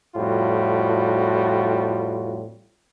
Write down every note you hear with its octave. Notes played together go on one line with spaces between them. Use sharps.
F2 A2 G3 F4 F#4